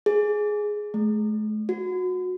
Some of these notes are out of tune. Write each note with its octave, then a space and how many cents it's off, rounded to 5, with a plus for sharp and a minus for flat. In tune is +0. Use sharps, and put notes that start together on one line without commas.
G#4 +10
A3 -45
F#4 -20